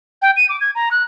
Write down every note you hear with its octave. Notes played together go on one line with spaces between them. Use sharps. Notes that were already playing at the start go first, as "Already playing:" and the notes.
G5
D#7
D6
G#6
A#5
F#6